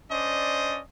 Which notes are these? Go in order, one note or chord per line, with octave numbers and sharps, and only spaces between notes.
C#4 D4 C5 D5 D#5